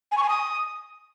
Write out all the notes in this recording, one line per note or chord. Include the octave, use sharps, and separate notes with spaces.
G#5
C#6
G#5
D#6